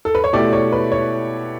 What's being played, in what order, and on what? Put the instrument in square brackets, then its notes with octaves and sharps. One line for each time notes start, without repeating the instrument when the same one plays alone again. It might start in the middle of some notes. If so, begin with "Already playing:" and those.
[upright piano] A4
B4
C#5
[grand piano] B2 A3 E4 G4 [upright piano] D5
[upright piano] C#5
B4
C#5